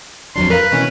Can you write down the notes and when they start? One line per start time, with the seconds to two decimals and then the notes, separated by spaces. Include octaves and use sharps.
0.36 F2 F#3 D4 C6
0.50 A#4 B4 F5
0.72 B2 E3 C#4